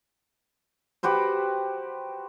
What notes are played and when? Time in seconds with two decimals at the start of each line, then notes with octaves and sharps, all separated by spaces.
1.03 F#4 G4 B4 C5